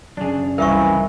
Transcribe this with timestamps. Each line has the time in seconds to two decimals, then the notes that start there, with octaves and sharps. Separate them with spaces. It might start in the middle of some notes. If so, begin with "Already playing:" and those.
0.17 F#2 C#3 D4 G#4
0.58 C2 E3 D#4 A#4 E5 F5 C#6